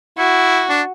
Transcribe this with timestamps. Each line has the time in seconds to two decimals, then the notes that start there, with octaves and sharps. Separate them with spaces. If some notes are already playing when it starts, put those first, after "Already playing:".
0.18 E4 F#4
0.69 D4